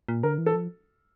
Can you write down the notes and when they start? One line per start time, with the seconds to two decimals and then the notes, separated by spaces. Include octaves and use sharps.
0.08 A#2
0.23 D3 A#4
0.38 E3
0.46 A4
0.54 F3